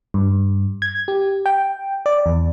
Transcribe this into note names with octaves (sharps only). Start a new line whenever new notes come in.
G2
G#6
G4
G5
D5
E2